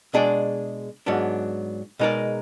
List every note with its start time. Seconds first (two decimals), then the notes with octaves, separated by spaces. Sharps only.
0.14 B2 G#3 D4 G#4 D5
1.06 G#2 F#3 B3 D4
1.99 B2 G#3 D#4 A#4 D5